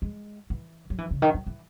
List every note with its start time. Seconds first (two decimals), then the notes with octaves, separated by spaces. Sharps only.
0.02 G#3
0.50 E3
0.90 F#3
0.98 E3
1.11 C#3
1.22 D#3
1.34 F#3
1.47 E3